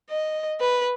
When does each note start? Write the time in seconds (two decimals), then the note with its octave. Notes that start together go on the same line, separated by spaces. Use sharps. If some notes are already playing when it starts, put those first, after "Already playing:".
0.10 D#5
0.61 B4